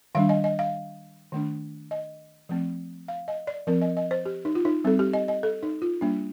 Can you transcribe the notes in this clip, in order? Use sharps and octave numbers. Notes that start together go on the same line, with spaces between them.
D#3 G3 D4 F5
D#5
D#5
F5
D#3 A3 D4
D#5
F3 A3 C4
F5
D#5
D5
F3 C4 A#4
D#5
D#5
C5
G4
D#4
F4
D#4
G3 C4 A4
G4
D#5
D#5
A4
D#4
F4
G3 A#3 D4